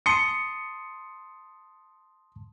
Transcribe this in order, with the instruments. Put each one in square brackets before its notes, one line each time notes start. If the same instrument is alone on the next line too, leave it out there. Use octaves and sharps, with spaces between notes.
[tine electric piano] A5 C6 D#6 [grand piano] C#7